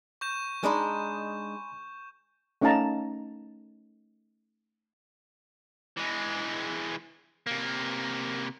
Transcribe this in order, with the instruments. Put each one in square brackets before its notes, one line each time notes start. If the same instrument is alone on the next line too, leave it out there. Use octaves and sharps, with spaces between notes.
[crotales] C#6 G6 E7
[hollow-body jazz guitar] G#3 D4 D#4 [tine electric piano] G#5 B5 C6
[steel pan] A3 C#4 D#4 F5 A5 A#5
[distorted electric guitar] E3 G#3
C3 A#3